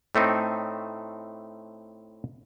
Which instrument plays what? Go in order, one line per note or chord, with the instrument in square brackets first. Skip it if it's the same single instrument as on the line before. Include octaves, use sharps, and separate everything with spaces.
[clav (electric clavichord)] A2 A3 C4 D#4